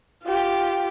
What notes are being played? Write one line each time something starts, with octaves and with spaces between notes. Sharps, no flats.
F4 G4